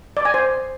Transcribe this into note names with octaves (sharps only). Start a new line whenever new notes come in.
D5
G#5
C5